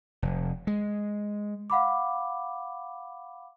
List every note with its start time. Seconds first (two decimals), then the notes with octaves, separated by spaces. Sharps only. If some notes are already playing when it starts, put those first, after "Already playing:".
0.22 F1
0.67 G#3
1.70 F5 F#5 B5 D6